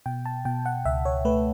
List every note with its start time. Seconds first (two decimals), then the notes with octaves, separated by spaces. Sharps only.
0.06 B2 G5
0.26 A5
0.45 B2 G5
0.66 F#5
0.85 C#2 E5
1.05 C#5
1.25 A3 B4